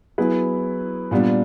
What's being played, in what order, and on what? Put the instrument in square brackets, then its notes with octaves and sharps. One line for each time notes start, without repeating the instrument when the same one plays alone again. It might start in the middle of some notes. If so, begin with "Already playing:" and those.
[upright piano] F#3 B3 E4 G#4 B4
A#2 G3 B3 D4